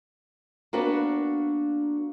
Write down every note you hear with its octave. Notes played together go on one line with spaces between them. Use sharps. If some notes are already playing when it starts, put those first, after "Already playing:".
A#3 B3 D4 F#4 B4